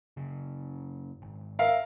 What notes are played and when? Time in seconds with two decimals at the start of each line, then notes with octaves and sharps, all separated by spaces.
0.17 F#1 C#3 C#4
1.22 G#1
1.59 A#4 E5 F5